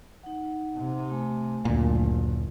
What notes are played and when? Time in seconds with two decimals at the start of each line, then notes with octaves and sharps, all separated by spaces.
0.23 D#4 F#5
0.77 C3
1.10 A3 G#5
1.65 F#1 D2 A#2